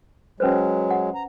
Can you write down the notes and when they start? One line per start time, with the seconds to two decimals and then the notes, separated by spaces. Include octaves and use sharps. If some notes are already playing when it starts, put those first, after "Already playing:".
0.40 F#3 G#3 C#4 B4 C5
0.91 F#5
1.15 A#5